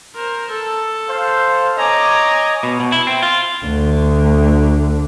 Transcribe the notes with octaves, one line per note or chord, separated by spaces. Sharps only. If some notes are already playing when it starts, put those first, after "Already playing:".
A#4 C5
A4
C5 F5
C#5 D#5 G#5 A#5 D6
B2
B2
E4
C4
F4
D2 D3